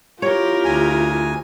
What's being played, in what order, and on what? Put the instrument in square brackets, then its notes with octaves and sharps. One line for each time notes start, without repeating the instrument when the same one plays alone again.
[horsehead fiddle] E4 F4 [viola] G4 A#4 [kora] C#5
[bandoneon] D2 G#5